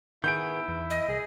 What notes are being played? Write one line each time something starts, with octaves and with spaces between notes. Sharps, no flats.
D#3 B3 E4 G#4 G6 D7
E2
D#5
C2 G#4